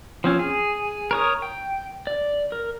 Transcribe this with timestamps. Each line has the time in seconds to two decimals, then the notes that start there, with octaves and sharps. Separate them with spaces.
0.24 F3 C4 C#4
0.39 G#4
1.11 A#4 C#5 D#6
1.42 G5
2.07 D5
2.52 A#4